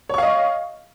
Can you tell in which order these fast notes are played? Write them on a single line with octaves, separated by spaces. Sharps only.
C#5 C#6 F5 D#5